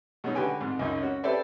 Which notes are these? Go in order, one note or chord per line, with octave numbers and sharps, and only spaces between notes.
B2 F#3 G#3 C#4 D#4
D3 F#4 G4 B4 G5 G#5
F2 G#2
C#2 F#2 D#4
C#4 F#4
G4 A4 B4 C5 D5 E5